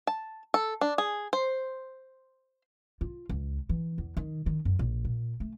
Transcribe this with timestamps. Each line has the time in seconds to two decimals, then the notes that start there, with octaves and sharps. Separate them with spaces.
0.07 A5
0.54 A4
0.81 D4
0.98 G#4
1.33 C5
3.01 F4
3.29 C#2
3.69 E3
3.98 E2
4.17 D#3
4.46 D#3
4.65 F#2
4.79 A#1
5.05 A#2
5.40 A3